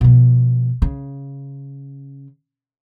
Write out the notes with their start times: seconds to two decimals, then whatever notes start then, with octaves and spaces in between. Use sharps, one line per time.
0.01 B2 F3
0.82 C#3